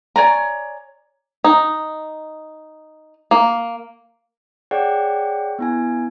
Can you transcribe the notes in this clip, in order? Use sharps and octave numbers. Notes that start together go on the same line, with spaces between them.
C#5 D5 G#5 A#5
D#4
A#3
G#4 C#5 D5 F#5 G5
B3 E4 G#5